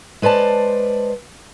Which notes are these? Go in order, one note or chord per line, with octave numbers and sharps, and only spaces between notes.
G#3 B4 C5 D5 A5